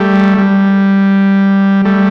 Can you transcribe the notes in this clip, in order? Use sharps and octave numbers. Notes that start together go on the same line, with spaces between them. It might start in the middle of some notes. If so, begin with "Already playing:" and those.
Already playing: G3 A3
G3
G3 A3